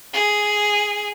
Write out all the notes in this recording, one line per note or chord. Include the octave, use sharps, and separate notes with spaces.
G#4